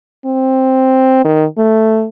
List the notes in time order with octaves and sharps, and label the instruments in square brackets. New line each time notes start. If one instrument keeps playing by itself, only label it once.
[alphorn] C4
D#3
A3